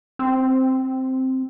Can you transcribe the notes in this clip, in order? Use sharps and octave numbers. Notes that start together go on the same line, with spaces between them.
C4